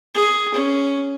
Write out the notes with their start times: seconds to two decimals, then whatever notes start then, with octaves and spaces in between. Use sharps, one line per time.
0.14 G#4
0.54 C#4